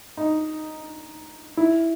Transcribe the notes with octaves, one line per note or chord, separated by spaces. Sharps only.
D#4
E4